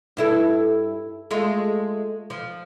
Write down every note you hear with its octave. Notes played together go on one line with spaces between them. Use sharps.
G2 E4 A4
G#3 A3 F4
F3